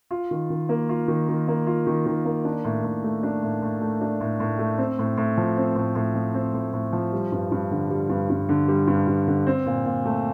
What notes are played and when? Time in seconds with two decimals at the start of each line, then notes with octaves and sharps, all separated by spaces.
0.11 F4
0.31 D#3
0.50 D#3
0.69 A#3
0.89 F4
1.08 D#3
1.29 D#3
1.48 A#3
1.67 F4
1.87 D#3
2.06 D#3
2.25 A#3
2.45 D4
2.65 A2
2.84 A2
3.04 A3
3.23 D4
3.43 A2
3.62 A2
3.81 A3
4.01 D4
4.21 A2
4.40 A2
4.59 A3
4.78 C4
4.99 A2
5.17 A2
5.38 F3
5.57 C4
5.76 A2
5.95 A2
6.15 F3
6.34 C4
6.54 A2
6.73 A2
6.93 F3
7.13 G3
7.32 G2
7.52 G2
7.71 D3
7.90 G3
8.09 G2
8.30 G2
8.49 D3
8.68 G3
8.87 G2
9.07 G2
9.27 D3
9.47 C4
9.66 A#2
9.85 A#2
10.05 A3